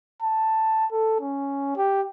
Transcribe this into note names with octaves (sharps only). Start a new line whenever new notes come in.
A5
A4
C#4
G4